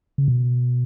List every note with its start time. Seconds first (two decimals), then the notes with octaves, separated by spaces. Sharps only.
0.18 C#3
0.28 B2